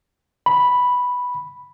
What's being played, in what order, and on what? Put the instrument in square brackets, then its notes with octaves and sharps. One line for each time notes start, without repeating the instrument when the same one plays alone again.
[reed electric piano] B5